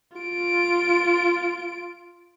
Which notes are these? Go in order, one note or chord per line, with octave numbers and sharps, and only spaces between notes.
F4 D7